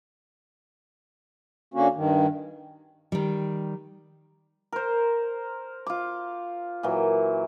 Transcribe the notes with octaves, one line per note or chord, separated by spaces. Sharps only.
D3 A#3 C#4 F#4
G2 D#3
D#3 G3
A#4 C5
F4 D6
A#2 E3 F#3